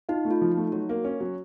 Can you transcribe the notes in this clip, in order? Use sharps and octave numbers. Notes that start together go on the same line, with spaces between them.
D#4 F4
A3
F4
F3
D#4
A3
F#3 F#4
A#3
C#4
F#3